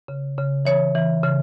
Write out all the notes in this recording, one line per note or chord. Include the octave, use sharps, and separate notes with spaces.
C#3
C#3
E3 C#5
E3
C#3